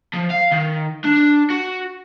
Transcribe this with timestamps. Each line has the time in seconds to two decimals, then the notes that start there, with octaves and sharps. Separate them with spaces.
0.13 F3
0.30 F5
0.52 D#3
1.04 D4
1.50 F#4